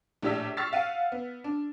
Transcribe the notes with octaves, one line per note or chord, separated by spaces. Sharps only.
A#1 A2 G4 D5 E6 B6
C#6 E6 F6 A6 B6 C7
F5 F#5 D#7
B3
D4